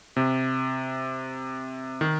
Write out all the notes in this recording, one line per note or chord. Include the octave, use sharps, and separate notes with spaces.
C3
D#3